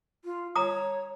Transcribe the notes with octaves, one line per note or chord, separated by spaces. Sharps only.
F4
C#5 A#5 D#6